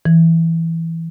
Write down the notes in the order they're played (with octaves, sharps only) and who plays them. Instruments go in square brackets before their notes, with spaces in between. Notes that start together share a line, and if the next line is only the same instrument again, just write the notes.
[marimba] E3